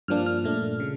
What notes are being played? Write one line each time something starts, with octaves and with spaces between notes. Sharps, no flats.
G2 F3 A#3 D4 F6
F6
A#2 A3 D4
C#3